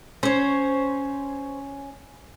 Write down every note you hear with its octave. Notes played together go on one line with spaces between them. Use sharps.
C#4 C5 C#5